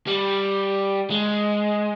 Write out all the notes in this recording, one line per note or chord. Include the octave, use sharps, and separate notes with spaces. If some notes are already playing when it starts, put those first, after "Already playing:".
G3
G#3